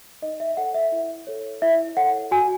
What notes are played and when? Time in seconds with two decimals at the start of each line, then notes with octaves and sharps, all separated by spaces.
0.22 D#4 D#5
0.40 E5
0.57 A4 C#5 F#5
0.74 E5
0.92 E4
1.27 A4 C#5
1.62 E4 E5
1.97 A4 C#5 F#5
2.31 F#4 G#5